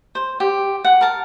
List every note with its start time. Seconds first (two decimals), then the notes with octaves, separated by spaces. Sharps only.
0.15 C5
0.40 G4
0.84 F#5
1.01 A#4 A5